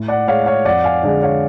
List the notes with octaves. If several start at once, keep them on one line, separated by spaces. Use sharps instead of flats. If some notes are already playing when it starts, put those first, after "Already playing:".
Already playing: A2
D5 F#5
G#3 C#5 F5
C#5 F5
F2 D5 F#5
F5 G#5
D3 G#3 D5 F#5
C#5 F5